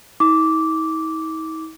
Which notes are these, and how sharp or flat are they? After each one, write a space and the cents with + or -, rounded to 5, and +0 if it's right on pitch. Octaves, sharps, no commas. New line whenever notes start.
D#4 +45 D6 -10